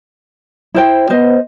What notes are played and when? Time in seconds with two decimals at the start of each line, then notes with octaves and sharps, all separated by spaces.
0.75 E4 C5 G5
1.10 B3 C5 D#5